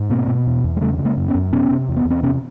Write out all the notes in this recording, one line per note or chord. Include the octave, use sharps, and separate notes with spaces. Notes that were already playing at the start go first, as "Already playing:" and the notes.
Already playing: G#2
B2 A#3 C4
B2
E2
E2
G#3
C#3 G3 A3
C#3
G#3 A#3
F#2
B3 C#4
F#2
C3 B3 C#4
C3
E2
B3
E2
C4
C3 B3 C#4